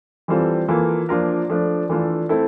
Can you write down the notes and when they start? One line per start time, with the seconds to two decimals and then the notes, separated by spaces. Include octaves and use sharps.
0.28 E3 G3 C4 F4 A4
0.68 E3 A#3 F4 A4
1.09 F3 A#3 D4 F4 A#4
1.50 F3 A3 D4
1.89 E3 A3 D4 F4 A4
2.29 A3 C4 E4 A4